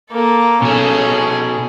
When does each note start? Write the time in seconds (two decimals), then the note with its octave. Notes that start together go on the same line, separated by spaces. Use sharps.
0.11 A#3 A4
0.62 B2 C#4 G#4 A4